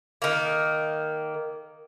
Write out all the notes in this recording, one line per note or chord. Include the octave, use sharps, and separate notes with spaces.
D#3 A#3